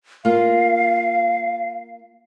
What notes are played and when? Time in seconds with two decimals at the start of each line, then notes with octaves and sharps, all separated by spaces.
0.25 A#3 F4 F5